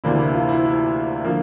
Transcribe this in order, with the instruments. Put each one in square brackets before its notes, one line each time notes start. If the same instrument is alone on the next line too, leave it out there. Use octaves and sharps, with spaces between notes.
[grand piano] D2 C3 E3 A#3 D4 E4
E4
F4
E4
E4
D3 F3 A#3